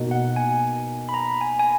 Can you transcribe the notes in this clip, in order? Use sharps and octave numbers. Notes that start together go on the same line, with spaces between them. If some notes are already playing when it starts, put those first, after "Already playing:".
Already playing: B2 A#3 D#4 F#4
F#5
G#5
B5
A#5
G#5
G#5